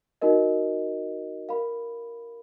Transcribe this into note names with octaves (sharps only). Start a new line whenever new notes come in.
D#4 F#4 A#4 D#5
A#4 F5 B5